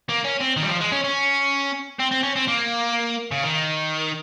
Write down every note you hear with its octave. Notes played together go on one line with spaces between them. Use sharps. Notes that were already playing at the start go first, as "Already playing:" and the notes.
A#3
C#4
C4
D#3
G3
F3
G#3
C#4
C#4
C4
C4
C#4
C4
A#3
C#3
D#3